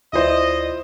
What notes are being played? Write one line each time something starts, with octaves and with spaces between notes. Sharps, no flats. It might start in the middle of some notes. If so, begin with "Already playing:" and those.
D2 E4 F4 C5 D5 D#5